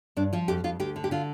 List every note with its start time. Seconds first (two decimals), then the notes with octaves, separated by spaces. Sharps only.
0.17 G2 D4
0.33 F3 F4
0.48 F2 G4
0.64 F2 F4
0.80 D2 G4
0.96 D3
1.04 G4
1.11 D3 F4